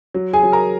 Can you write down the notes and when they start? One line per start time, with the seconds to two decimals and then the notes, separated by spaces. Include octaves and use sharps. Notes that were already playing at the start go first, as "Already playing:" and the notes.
0.14 F#3
0.33 G#4 G#5
0.43 F#3
0.52 A#4 A#5